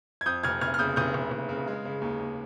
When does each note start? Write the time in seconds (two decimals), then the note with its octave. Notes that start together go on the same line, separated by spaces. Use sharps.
0.21 G#6
0.26 F2 D#6 G6
0.43 F1 F6 G#6
0.61 F1 F6 G#6
0.74 F6
0.79 C#3 D#6 G6
0.96 F1 D#6 G6
1.14 F1
1.31 F1
1.49 C#3
1.68 G#3
1.85 C#3
2.02 D#2
2.19 D#2